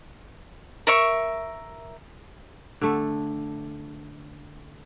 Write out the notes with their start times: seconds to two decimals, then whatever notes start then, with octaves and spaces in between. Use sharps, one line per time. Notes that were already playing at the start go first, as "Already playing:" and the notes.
0.87 A#4 E5 C#6
2.81 D3 A3